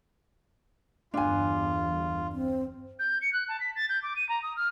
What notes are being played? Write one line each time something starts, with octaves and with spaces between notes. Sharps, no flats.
G1 E2 G2 D4 F4 G#5
C4
G6
C#7
F#6
A5
B6
A6
G6
D6
D#7
A#5
D#6
F6